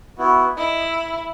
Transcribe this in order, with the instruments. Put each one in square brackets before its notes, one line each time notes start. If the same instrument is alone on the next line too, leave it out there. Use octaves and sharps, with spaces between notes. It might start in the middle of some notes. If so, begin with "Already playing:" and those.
[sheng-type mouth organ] B3 E4 F#4
[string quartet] E4 [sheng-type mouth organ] D#5
[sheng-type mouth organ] E5